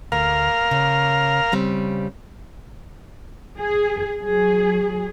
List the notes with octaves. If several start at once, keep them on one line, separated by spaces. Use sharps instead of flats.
D2 A#4 F5
C#3
C#3 G3 C4
G#4
F#3 G#4